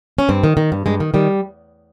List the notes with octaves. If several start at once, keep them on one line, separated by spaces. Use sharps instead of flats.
C#4
G2 C4
D#3
D#3
G2
G2 G#3
D#3
D#3 G3